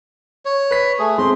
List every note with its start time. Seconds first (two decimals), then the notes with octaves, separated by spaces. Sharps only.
0.45 C#5
0.71 B4 B6
0.99 A3 G#4
1.18 G#3 C4 C6